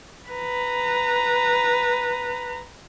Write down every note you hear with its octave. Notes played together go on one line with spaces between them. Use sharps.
B4 A#5